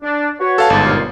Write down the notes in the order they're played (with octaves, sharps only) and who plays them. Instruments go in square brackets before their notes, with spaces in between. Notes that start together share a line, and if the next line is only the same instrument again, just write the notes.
[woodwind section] D4
F#4 B4 C#5
[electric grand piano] A4 F5 A5
[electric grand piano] G1 G#2 [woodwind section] A5
[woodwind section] D#2 A#2 F4